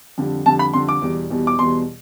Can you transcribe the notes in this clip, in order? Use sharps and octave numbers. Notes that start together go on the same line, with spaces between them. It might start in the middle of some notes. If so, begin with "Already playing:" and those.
F2 D3 G3
F2 D3 G3 A5
B5
F2 D3 G3 C6
D6
E2 B2 G3
E2 B2 G3
D6
E2 B2 G3 C6